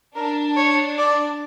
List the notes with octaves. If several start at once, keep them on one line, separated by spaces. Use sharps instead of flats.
D4 A#4
C#5
D5